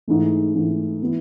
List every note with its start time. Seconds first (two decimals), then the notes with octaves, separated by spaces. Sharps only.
0.08 G#2 E3 A3
0.55 G#2 E3 A3
1.02 E3 B3 E4